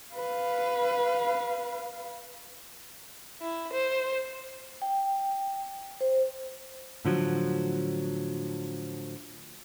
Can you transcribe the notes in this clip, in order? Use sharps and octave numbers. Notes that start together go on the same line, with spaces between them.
B4 F5
E4
C5
G5
C5
A2 D3 F3 F#3